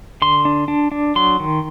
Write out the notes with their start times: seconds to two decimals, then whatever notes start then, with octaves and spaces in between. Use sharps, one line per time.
0.22 D3 C6
0.45 D4
0.68 D4
0.91 D4
1.16 F#3 C6
1.40 D#3